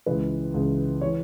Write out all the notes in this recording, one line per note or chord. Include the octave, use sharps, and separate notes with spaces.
C#2 C#3 E3 B4
C#2 C#3 E3
C#5
E3